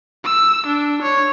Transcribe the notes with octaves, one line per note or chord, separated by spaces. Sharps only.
E6
D4
C#5